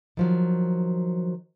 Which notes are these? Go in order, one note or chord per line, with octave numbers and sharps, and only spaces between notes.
D#3 F3 F#3